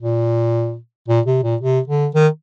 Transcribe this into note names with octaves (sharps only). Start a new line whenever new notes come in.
A#2
A#2
C3
A#2
C3
D3
D#3